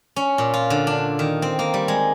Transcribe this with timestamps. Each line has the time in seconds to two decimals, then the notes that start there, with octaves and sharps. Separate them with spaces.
0.16 C#4
0.38 A#2
0.54 F4
0.70 D3
0.87 D4
1.19 D#3
1.42 C4
1.59 A#3
1.74 G3
1.88 G#3